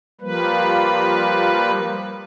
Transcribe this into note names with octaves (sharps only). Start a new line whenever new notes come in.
F3 G3 A#3 B4